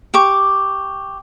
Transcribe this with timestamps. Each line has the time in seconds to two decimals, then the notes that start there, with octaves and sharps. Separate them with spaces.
0.14 G4 C#6 D6